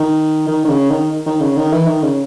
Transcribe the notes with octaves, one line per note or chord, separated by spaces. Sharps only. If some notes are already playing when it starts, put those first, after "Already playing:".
Already playing: D#3
D#3
D#3
C#3
D#3
D#3
C#3
D#3
E3
D#3
C#3